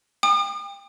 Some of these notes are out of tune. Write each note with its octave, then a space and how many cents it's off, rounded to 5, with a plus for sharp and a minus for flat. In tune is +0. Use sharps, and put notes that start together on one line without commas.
G5 +35 D#6 -45